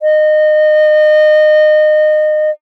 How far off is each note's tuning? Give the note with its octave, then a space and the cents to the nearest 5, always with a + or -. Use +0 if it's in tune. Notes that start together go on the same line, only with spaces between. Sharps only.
D#5 -25